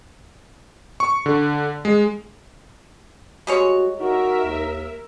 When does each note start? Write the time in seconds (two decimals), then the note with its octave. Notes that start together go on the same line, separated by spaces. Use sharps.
1.00 C#6
1.26 D3
1.85 G#3
3.47 G3 G#3 F#4 C#5
4.00 D#4 F#4 A#4 E5
4.44 D#2